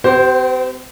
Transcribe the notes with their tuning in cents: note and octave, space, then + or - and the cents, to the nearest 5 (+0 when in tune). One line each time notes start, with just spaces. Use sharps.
C4 -40 G4 -40 C5 +0